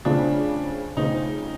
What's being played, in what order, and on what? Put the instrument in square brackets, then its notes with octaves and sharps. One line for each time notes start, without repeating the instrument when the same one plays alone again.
[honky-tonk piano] C#3 F3 A3 C4 F4 [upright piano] D4
[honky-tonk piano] C#3 F3 A3 C4 F4 [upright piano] D#4